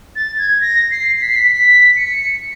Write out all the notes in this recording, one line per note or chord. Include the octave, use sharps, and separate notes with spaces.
A6
G#6
A#6
C7
B6
C7
B6
B6
C#7